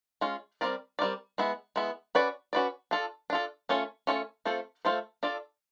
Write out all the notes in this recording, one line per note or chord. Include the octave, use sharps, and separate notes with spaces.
G#3 C#4 F4
G3 C4 F4 A#4 D5
G3 C4 F4 A#4 D5
G#3 B3 E4
G#3 B3 E4
C#4 F#4 B4 D5
C#4 F#4 B4 D5
D4 F4 A4
D4 F4 A4
A3 C#4 F4 A4 C#5
A3 C#4 F4 A4 C#5
A3 C4 F4 A4 C5
A3 C4 F4 A4 C5
D4 F4 A4 D5